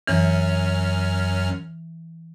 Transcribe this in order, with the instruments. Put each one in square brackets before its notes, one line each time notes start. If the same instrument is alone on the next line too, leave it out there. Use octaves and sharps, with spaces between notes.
[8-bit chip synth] F#2 C#4 F6 [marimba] E3